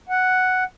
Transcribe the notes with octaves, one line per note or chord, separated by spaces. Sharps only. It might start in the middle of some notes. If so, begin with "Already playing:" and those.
F#5